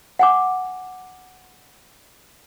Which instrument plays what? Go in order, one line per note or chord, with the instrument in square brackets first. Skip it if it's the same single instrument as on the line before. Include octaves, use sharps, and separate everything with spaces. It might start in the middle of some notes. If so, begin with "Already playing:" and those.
[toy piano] F#5 G#5 D6